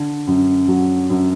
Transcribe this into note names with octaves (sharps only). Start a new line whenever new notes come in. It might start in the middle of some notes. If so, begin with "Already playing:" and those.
Already playing: D3
F#2
F#3
F#2